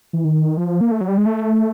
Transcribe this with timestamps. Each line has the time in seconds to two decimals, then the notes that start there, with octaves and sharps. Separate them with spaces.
0.13 E3
0.24 D#3
0.57 F3
0.81 A#3
0.91 A3
1.01 F#3
1.08 G3
1.18 G#3
1.26 A3